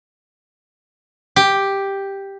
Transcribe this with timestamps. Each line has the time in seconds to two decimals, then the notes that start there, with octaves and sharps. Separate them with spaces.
1.36 G4